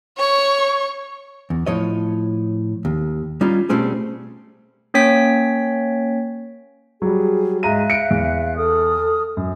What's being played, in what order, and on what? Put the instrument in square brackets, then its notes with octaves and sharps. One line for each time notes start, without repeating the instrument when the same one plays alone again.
[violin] C#5 C#6
[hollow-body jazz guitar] E2
A2 F3 C#5 D#5
D#2
G3 C#4 D#4 F4
B2 G3 A3 C4 C#4 G#4
[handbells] A#3 C#4 C#5 G5 B6
[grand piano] F#3 G3 [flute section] G#4
[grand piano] G#2 A#5 D#7 [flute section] E5 F5 F#6
[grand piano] C#7 D7
E2
[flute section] A4 D#6 F6
[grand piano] F#2